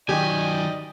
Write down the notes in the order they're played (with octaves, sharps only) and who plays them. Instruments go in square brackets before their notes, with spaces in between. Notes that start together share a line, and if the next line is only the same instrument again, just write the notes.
[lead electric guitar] D#3 F#3 [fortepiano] G4 [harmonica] D5 D#5 G5 [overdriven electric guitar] G#5